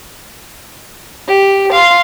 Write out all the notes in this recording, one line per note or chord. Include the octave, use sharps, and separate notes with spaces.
G4
F5 C6